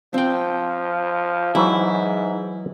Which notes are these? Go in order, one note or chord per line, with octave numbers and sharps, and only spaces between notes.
F3 C4 G5
G#2 E3 F#3 E4